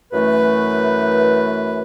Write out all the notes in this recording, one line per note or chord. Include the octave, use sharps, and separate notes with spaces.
F#2 E3 A3 B4